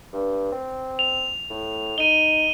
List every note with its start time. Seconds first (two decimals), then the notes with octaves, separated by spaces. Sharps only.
0.12 G2
0.52 C4
0.99 F7
1.50 A2
1.98 D#4 D#7 G7